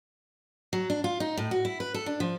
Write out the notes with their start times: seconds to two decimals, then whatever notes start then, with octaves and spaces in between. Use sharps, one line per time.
0.73 F#3
0.90 D4
1.04 F4
1.20 D#4
1.37 A2
1.51 F#4
1.65 E4
1.80 B4
1.94 A4
2.06 D4
2.20 F3